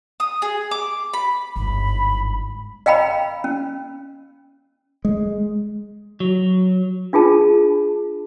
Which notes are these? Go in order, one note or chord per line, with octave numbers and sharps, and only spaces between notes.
D#6
G#4
D6
B5
G1 G#2 B5
D#5 F5 G5 A#5 B5
C#4
G#3
F#3
D4 F4 G#4 A5